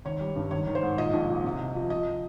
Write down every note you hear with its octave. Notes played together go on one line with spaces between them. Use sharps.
G#1 C#5
G3
G2
G#1 C#5
D#3
C5
G#2
A#2 D#5
A#1
A#2
C3
C2
F3
F3 D#5